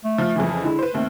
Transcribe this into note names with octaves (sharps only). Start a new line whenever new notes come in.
A3
F3 F6
F2 C#3 E3
D3 G#3 E4
B4 C5
D#2 A3 C4